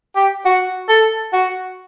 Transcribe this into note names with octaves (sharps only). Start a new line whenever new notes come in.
G4
F#4
A4
F#4